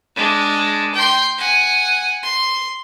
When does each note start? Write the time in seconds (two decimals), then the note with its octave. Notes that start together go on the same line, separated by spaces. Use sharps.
0.15 G#3 D4
0.94 G5 C6
1.38 F#5 G#5
2.22 C6